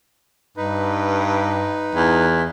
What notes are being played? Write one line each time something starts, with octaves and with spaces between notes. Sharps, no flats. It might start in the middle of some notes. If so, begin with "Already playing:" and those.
G2 D#4 B4
E2